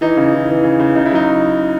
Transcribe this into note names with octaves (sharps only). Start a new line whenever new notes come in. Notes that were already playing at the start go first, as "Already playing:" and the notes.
E3 D#4
C#3
E3
E3
C#3
C#3
C#3 D#4
E4
F#3 D#4